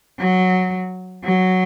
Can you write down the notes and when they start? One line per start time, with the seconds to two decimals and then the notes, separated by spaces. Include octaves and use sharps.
0.20 F#3
1.24 F#3